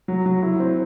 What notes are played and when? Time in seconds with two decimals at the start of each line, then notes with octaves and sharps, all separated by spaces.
0.08 F#3
0.26 F#3
0.42 E4
0.60 C4